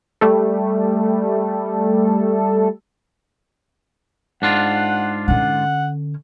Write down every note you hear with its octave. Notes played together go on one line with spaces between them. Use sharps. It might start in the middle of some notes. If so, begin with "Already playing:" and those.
G3 A3 A4
G#2 D4 F4 F#5
D3 C#4 F#5